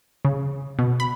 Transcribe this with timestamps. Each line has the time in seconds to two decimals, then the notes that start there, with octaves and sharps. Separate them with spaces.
0.25 C#3
0.79 B2
1.00 B5